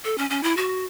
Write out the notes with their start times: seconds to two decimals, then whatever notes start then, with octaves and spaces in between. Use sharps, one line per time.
0.04 A4
0.18 C#4
0.30 C#4
0.43 E4
0.57 F#4